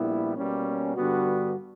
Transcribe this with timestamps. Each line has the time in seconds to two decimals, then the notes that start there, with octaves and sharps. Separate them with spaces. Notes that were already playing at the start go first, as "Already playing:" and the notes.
Already playing: A#1 A#2 G3 B3 E4
0.36 B2 G3 A#3 C#4
0.96 G2 D3 G3 B3 F#4